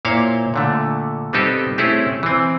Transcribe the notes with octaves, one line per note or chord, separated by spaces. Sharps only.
A#2 A#3 E4 C5 C#5 F5
A#2 D3 A3
G3 B3 C4 D#4 G4 A4
A3 C4 C#4 E4 G4 G#4
E3 C4